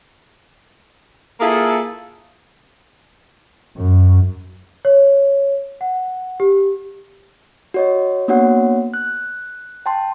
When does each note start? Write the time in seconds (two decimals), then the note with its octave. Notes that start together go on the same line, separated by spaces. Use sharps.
1.40 A#3 E4 F4 G#4 A4
3.77 F#2
4.85 C#5
5.81 F#5
6.40 G4
7.74 F#4 C#5 D#5
8.28 A#3 B3 D4 F#4 C#5 F#5
8.94 F#6
9.86 G5 A5 C6